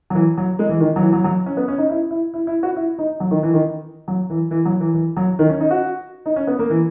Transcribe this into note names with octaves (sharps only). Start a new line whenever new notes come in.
F#3
E3
F#3
G#3
E3
D#3
F#3
E3
F#3
F#3
C#4
B3
C#4
D#4
E4
E4
E4
E4
F#4
E4
D#4
F#3
D#3
E3
D#3
F#3
E3
E3
F#3
E3
E3
F#3
D#3
C#4
D#4
F#4
D#4
C#4
B3
A#3
E3